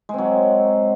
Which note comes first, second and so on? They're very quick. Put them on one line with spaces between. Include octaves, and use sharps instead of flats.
G#3 C4 F#3